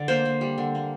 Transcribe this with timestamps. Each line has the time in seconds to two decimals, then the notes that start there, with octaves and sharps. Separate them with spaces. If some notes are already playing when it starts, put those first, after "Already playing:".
Already playing: D3 D5
0.08 A#3 C5
0.25 A#3
0.41 G3
0.58 D3
0.75 A#3